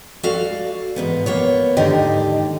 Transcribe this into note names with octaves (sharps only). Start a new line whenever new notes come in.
F#4 A4 D5 F5
E2 G#2 B3
A#3 B3 C#5
D#2 G#2 D3 D#4 G4 D#5